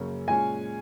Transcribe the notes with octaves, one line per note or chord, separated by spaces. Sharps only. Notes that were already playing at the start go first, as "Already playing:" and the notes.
Already playing: F#2 C#3 A#3 C#4
A#2 G#3 C#4 G#5